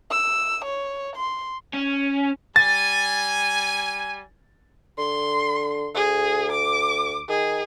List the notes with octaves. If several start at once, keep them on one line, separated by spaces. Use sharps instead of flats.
E6
C#5
C6
C#4
G3 G#5 A6
D3 C6
D2 G#4
D6
D#3 G#4